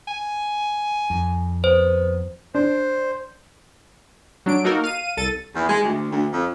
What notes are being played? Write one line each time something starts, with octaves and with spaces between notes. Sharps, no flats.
G#5
F2
B3 C5
D4 C5
F#3 D4 D7
A#3 D#4 F#4 A4 A#4
F5 D#7
C2 A4 A6 D#7
E2
G#3
D2
D2
F2